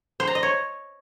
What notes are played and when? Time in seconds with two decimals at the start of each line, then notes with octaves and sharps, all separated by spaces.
0.20 C5
0.27 A#5
0.35 D#5
0.43 C#5